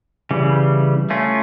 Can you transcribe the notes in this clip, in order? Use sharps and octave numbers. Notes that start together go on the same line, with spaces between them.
C#3 E3 G3
A3 C#4 F4